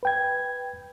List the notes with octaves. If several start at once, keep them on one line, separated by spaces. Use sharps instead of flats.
B4 G5 G#6